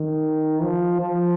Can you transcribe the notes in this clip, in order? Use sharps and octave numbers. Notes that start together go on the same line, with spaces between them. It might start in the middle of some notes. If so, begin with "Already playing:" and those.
Already playing: D#3
F3
F3